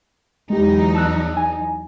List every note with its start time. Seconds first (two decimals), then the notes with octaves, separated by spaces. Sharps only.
0.50 E2 F#3 G#3 D#4 G4
0.95 A5 E6 F#6
1.37 G#5